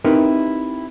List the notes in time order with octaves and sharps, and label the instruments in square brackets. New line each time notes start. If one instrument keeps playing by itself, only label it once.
[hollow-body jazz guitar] C4 D#4 E4 G4 A#4 B4